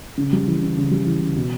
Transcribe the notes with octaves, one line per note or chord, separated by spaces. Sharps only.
C#3
G3
E3
C#3
C#3
G3
E3
C#3
B2